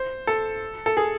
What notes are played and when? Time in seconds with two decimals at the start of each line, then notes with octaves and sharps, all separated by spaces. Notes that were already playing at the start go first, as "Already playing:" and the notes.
Already playing: C5
0.27 A4
0.86 A4
0.97 G#4